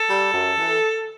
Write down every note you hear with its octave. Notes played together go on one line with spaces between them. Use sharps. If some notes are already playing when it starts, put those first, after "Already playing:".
Already playing: A4
G3
F#2
E3